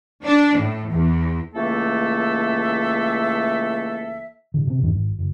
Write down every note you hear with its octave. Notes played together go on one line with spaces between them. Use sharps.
D4
A2
E2
C#2 E3 A3 A#3 A4 E5
A2 D3
C3 C4
G#1 E2 G2 D#3
G#1
F#1